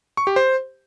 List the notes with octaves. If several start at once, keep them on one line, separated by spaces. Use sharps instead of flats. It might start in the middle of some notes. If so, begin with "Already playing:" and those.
C#6
G4
C5